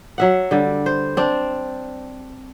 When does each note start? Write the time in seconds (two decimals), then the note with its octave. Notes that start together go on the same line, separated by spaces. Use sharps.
0.18 F#3 E5 F#5
0.51 D3 G3
0.86 C5
1.17 C4 D4